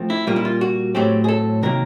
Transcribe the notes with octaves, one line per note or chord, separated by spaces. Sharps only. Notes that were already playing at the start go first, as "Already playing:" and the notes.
Already playing: F3 A3 C4
E4
A#2 G3 A#3 F4
E4
F4
F#4
A2 F#3 A3 C4 G4
G#4
A4
C3 D#3 F#3 A#3 A#4